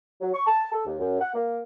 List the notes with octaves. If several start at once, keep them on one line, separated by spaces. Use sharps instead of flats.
F#3
C#6
A5
A4
D#2
F#2
F#5
A#3